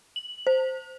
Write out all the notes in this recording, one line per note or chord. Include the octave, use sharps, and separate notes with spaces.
F#7
C5